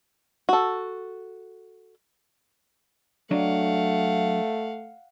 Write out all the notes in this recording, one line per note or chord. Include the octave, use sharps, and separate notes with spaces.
F#4 A4
F#3 A3 D4 D#5 F5 F#5